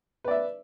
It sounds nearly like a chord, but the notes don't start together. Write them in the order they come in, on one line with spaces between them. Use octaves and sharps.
B4 D5 E5